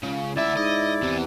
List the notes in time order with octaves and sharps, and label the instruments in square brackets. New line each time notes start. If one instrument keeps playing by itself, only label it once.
[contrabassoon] C#2 [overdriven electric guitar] C#3
[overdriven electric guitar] D2 E5 [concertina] E4 D5
[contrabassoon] G#2 [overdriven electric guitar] D#5
[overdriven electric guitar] E2 E3 [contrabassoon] C3